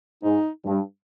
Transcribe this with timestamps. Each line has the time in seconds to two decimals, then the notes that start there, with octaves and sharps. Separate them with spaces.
0.23 G#2 D#4
0.65 G2